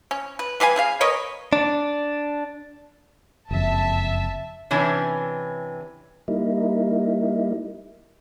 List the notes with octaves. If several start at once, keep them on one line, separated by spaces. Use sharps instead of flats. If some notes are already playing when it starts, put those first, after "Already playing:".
C#4
B4
G3 B4 F5 G#5
C#4 G#4 F5
A#4 B4 C#5 D#5
D4
F#1 F2 E5 A5
C3 E3 C#4 D4
G3 A#3 D#4 E4